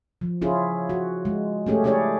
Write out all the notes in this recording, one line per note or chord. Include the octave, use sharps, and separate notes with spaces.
F3
C#4 E4 F4 G#4
F#4
G#3
A3 C#4 G4 G#4
C#4 E4 G4 G#4 C#5 D5